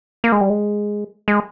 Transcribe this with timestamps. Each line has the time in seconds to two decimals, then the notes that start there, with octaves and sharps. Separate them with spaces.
0.24 A#3
0.32 G#3
0.41 G3
0.50 G#3
1.28 G#3